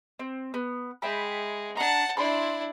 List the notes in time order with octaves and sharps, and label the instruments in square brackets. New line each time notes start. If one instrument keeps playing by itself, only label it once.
[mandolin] C4
B3
[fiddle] G#3 [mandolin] E5 G5 B5
[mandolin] D4 A#5 [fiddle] F#5 A5
[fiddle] D4 E4 [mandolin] B5 C6